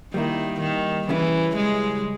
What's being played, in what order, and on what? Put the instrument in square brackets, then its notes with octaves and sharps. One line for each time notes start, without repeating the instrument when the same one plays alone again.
[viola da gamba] D#3 [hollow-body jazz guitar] G3 A#3 E4
[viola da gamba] D#3
[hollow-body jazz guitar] C#3 G3 C#4 E4 [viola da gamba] E3
[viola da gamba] G#3